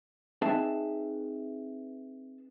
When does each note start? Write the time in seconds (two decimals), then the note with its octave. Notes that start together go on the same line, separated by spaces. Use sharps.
0.42 C4 D#4 G#4 B4 E5 A5